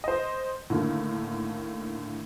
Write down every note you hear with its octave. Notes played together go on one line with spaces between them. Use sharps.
C5 D#5
A2 D3 D#3 A#3